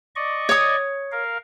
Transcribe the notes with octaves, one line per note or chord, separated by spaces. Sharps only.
D5 D#5 C#6
C#5 D#6
A#4 F5